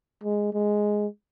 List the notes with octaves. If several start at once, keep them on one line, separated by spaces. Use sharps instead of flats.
G#3
G#3